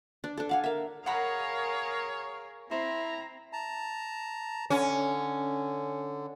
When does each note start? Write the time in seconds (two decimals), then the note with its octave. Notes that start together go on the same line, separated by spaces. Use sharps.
0.24 D4
0.37 D4 A4
0.49 D5 F5 F#5 G#5
0.64 A#4 E5 F5
1.06 G#4 A#4 C#5 F5 F#5 A#5 B5
2.71 C4 E4 C5 A#5
3.53 A5 A#5
4.70 D3 C#4